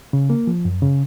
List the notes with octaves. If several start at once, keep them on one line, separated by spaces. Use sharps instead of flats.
C#3
A#3
F3
F#2
C#3